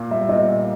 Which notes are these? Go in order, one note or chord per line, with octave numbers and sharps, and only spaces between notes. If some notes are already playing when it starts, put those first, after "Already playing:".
Already playing: A#2 A#3 F5
G3 E5
A#2 D#5
A#2